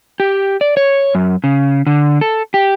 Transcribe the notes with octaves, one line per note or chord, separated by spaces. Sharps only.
G4
D5
C#5
F#2
C#3
D3
A4
G4